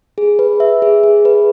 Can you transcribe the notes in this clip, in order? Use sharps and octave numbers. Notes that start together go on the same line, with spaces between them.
G#4
B4
E5
G#4
G#4
B4